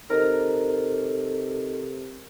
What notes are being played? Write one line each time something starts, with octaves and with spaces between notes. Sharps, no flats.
C3 D#4 A4 A#4 C5 D#5 A#5